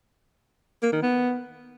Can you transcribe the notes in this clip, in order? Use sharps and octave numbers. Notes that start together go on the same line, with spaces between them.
A#3
D#3
B3